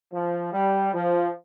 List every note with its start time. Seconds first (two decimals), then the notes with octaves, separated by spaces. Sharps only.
0.13 F3
0.53 G3
0.93 F3